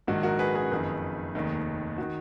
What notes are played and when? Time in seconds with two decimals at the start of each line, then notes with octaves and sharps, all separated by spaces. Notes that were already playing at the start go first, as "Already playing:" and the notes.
0.07 A#1 G#2 D#3 F#4
0.23 F#4 A#4
0.39 G#4 B4
0.55 G#4 B4
0.71 F#1 F2 D#3
1.35 F1 D#2 D#3
1.98 D#3 F#4